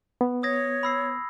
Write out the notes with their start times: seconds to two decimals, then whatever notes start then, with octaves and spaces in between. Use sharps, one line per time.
0.21 B3
0.43 C#5 D#6 G#6 A#6
0.83 B5 E6 C7